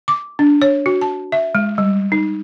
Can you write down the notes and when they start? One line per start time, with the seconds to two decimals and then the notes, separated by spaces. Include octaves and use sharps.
0.08 D6
0.39 D4
0.62 C#5
0.86 F#4
1.01 A5
1.32 E5
1.55 G#3
1.78 G3
2.12 D#4